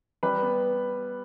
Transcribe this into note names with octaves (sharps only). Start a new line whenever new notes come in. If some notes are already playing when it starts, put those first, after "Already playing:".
G3 B4
B3